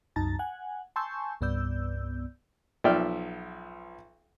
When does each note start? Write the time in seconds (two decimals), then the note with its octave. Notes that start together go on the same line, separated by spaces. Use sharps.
0.16 C2 F#2 D#4 A5 A#5 A6
0.39 F#5 G#5
0.96 G#5 A5 C6 C#6 E6 G6
1.41 C2 G2 B3 D5 E6 G6
2.84 B1 F3 D5 E5 G5 F6